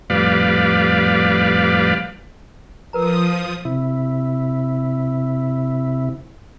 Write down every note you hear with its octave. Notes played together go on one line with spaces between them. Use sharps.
F2 A2 G3 B4 D5 F5
F3 A#4 B4 A#5 D#6
C3 E4